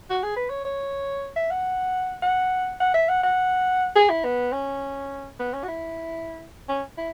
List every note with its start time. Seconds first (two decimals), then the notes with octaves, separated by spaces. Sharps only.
0.10 F#4
0.23 G#4
0.36 B4
0.50 C#5
0.65 C#5
1.36 E5
1.51 F#5
2.22 F#5
2.81 F#5
2.94 E5
3.09 F#5
3.23 F#5
3.96 G#4
4.10 E4
4.25 B3
4.52 C#4
5.40 B3
5.53 C#4
5.64 F#4
5.68 E4
6.69 C#4
6.98 E4